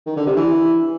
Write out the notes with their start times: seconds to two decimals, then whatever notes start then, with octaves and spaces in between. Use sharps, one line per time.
0.06 D#3
0.17 D3
0.27 C3
0.37 E3